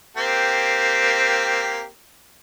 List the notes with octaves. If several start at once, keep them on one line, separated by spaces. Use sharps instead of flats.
A#3 C4 G4